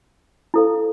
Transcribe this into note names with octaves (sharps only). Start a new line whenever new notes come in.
E4 A4 C5 F5